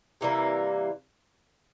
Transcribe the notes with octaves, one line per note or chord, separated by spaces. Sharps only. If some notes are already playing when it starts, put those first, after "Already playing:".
C3 E3 G3 A#3